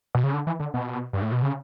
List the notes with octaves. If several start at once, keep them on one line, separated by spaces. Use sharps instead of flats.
B2
C#3
D3
E3
D3
B2
G2
A2
B2
C#3